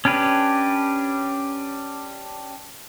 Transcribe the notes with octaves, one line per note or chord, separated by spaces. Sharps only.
C#4 D4 G4 B4